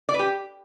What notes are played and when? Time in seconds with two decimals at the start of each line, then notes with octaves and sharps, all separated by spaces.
0.09 D5
0.14 B4
0.19 G4